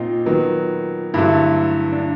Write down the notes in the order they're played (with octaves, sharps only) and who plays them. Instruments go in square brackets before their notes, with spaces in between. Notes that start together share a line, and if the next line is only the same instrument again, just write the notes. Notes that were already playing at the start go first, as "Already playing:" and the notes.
Already playing: [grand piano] A#2 C4 D#4 [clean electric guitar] F4
[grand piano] D#3 F#3 B3
[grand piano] G2 D3 F#3 A3 [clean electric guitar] E4
[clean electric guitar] D4